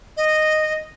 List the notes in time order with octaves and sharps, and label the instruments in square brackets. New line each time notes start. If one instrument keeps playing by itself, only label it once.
[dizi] D#5